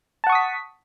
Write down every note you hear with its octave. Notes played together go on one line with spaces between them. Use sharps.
F#5 A5 C#6 D#6 B6